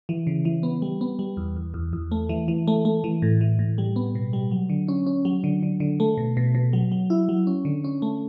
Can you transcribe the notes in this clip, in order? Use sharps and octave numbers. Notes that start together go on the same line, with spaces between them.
E3
C#3
E3
B3
G3
B3
G3
E2
E2
E2
E2
A3
E3
E3
A3
A3
E3
A2
E3
A2
G3
B3
B2
G3
F#3
D3
C#4
C#4
F#3
D3
D3
D3
A3
B2
B2
B2
F#3
F#3
E4
F#3
C#4
D3
C#4
A3